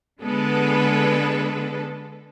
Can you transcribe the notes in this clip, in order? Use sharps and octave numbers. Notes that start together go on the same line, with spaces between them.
D3 G#3 B3 A4 B4